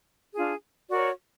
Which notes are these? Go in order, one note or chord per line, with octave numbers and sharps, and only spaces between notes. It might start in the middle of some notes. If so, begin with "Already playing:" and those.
D4 F4 G#4
F#4 A#4 C#5 D5